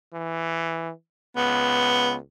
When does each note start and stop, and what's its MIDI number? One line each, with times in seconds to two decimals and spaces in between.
0.13 0.91 52
1.37 2.19 37
1.37 2.15 59